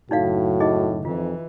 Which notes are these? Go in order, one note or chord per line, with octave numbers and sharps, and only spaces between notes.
F#1 A2 D#4 F#4 D5 F5
D#4 G#4 D#5
F2 E3 F4